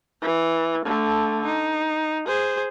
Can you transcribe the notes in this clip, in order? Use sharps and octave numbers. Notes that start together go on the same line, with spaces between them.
E3
D3 A3
D#4
G#4 C5